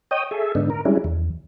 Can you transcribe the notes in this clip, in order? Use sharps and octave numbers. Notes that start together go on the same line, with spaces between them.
C#5 D#5 G5 D#6
G#4 A4 E5
G#2 D3 B3 D4 D#4
A#4
G3 G#3 C#4 D4 E4
E2